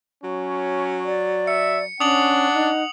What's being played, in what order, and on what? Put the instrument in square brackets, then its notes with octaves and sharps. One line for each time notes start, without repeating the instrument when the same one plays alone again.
[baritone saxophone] F#3 [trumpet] C#4
[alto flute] D5
[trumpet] E5 [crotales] C#7
[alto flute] C#4 [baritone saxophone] D4 [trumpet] F#5 [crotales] D#6 F#7
[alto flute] D#4